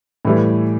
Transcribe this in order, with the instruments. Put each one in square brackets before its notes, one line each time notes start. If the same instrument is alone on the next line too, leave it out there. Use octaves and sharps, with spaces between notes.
[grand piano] A2 E3 G3